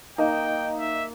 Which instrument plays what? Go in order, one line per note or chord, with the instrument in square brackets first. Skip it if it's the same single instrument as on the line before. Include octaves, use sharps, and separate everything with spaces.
[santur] A#3 [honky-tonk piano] D#4 [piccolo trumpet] G5
[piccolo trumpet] E5